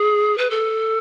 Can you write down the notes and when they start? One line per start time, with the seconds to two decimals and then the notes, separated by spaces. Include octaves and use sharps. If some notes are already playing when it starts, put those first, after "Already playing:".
Already playing: G#4
0.38 B4
0.50 A4